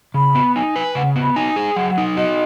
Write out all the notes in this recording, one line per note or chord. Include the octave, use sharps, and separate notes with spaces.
C#3 B5
B3
D#4 G#5
B4
C#3 F#5
B3
B5
D#4 G#5
G#4
F#3 F#5
F#5
D#4
F#4 D#5